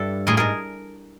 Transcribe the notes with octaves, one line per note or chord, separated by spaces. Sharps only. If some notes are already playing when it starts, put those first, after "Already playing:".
Already playing: G2 D4 E4 A4
A2 G#4 A#4
G#2 G#4 A#4